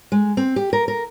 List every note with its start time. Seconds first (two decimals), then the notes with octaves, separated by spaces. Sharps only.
0.12 G#3
0.37 C4
0.56 G4
0.73 A#4
0.88 A#4